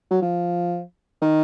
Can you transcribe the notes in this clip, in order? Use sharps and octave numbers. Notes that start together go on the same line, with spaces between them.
F#3
F3
D#3